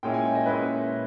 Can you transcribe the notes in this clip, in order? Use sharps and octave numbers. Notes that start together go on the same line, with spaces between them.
A#2 G#3 C#4 E4 G5
G#5
G5
D#5
A#2 G#3 C#4 E4 B4